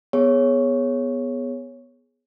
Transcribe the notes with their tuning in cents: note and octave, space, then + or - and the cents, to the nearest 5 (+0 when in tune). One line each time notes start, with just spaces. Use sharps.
B3 +0 G#4 +0 C#5 -5